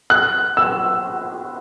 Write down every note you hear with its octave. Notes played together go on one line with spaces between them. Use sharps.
F#6
E6